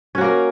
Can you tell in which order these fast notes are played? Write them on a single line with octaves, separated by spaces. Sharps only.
C#4 F#4 A#3 A#4